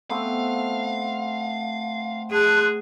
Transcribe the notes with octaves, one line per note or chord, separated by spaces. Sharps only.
A3 B3 C4 F5
G#4 A5 C6 F#6